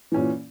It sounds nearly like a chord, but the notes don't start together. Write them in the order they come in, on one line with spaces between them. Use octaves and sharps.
E3 C#4 A#2